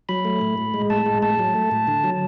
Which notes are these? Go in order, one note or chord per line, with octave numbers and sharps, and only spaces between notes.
F#3 B5
A3
A2
A2
G#3
A2 A5
G#3
A2 A5
F#3
A3
A2
D3
F#3